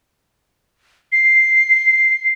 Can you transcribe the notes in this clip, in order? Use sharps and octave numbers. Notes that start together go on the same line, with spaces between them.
C7